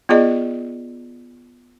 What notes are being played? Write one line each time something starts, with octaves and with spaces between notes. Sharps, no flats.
B3 F4 G#4 D5 D#5